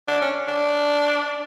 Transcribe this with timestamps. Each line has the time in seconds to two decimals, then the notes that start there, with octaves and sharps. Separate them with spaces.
0.08 D4
0.21 C#4
0.48 D4